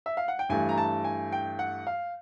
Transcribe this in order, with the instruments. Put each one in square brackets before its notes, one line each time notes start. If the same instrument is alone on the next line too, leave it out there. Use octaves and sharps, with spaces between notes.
[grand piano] E5
F5
F#5
G5
G2 E3 A3 G#5
A#5
A5
G#5
G5
F#5
F5